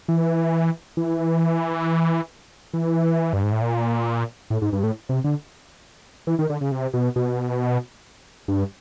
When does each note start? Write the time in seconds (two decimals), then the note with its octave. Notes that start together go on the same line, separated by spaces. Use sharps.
0.08 E3
0.97 E3
2.73 E3
3.33 G2
3.43 G#2
3.52 A2
3.62 A#2
4.50 A2
4.62 G#2
4.73 G2
4.83 A2
5.09 C3
5.24 D3
6.27 E3
6.39 D#3
6.50 D3
6.61 C#3
6.72 C3
6.94 B2
7.16 B2
8.48 G2